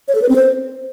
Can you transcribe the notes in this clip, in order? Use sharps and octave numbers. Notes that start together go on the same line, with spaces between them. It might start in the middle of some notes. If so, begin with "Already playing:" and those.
C#5
A4
B4
C4
C5